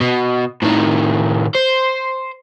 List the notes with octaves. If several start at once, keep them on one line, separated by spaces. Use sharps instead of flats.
B2
A2 D#3
C5